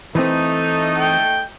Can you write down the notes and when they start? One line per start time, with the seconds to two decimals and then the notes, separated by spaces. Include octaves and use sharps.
0.15 E3 A3 C4 D#4
0.98 G5